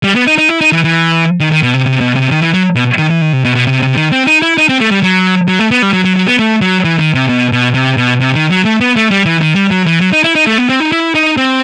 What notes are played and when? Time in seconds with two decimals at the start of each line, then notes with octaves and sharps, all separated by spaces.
0.04 G3
0.15 B3
0.27 D#4
0.38 D#4
0.49 E4
0.61 D#4
0.72 E3
0.84 E3
1.40 D#3
1.52 D#3
1.63 B2
1.74 C3
1.86 C3
2.01 B2
2.16 C3
2.31 D#3
2.42 E3
2.54 F#3
2.76 B2
2.98 D#3
3.10 E3
3.21 D#3
3.33 C3
3.45 B2
3.55 B2
3.67 C3
3.82 C3
3.97 D#3
4.12 C4
4.27 D#4
4.42 E4
4.58 D#4
4.69 C4
4.81 A3
4.91 G3
5.03 F#3
5.48 F#3
5.59 A3
5.71 B3
5.82 G3
5.93 F#3
6.05 F#3
6.16 F#3
6.28 B3
6.39 A3
6.61 F#3
6.84 E3
6.99 D#3
7.14 C3
7.29 B2
7.52 B2
7.74 C3
7.97 B2
8.21 C3
8.35 D#3
8.51 F#3
8.65 A3
8.81 B3
8.96 A3
9.11 G3
9.26 E3
9.41 D#3
9.55 G3
9.71 F#3
9.86 E3
10.01 F#3
10.12 D#4
10.24 E4
10.35 D#4
10.47 A3
10.58 B3
10.69 C4
10.80 D#4
10.92 E4
11.15 D#4
11.37 C4